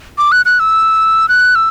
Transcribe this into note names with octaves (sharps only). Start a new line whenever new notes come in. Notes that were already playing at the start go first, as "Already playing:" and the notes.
D6
F#6
F#6
E6
F#6
E6